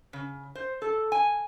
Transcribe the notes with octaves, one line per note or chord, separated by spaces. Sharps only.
C#3
C5
A4
G#5